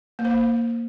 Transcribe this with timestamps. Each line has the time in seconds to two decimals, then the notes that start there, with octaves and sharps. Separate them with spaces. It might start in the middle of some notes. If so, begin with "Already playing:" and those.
0.19 A#3
0.25 C5
0.31 A#3